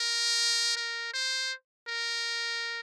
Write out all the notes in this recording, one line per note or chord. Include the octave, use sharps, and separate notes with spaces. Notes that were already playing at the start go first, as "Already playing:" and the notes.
Already playing: A#4
A#4
C5
A#4